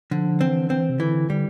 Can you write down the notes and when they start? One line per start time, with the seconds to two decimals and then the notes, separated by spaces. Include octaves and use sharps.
0.11 D3 F3
0.41 E3 C4
0.70 E3 C4
0.90 C3
0.99 D3 E3
1.30 D3 G3